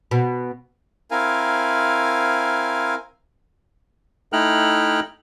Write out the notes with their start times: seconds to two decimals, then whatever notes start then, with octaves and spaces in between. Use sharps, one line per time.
0.11 B2
1.11 C4 E4 A#4 F5 G#5
4.33 A3 D#4 E4 G5 F6 F#6